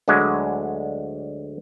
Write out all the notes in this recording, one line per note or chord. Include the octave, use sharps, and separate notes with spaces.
D2 D3 F#3 G#3